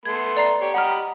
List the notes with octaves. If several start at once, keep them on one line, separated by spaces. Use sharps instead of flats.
A3 B3 C6 G#6
D5 A#5 C7
G4 C#5
G4 D#5 F#5 A#5 B5 F6